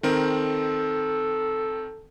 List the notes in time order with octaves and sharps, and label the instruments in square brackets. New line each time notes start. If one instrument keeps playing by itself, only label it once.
[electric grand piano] D#3 C4 A#4 [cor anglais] A4